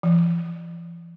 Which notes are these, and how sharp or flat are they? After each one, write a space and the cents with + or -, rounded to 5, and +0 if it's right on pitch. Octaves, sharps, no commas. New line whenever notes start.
E3 +45